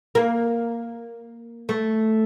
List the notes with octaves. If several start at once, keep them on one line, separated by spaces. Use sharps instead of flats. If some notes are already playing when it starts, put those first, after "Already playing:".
A#3
A3